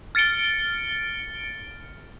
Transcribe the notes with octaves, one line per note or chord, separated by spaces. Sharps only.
F6 A6 C#7 D7 G7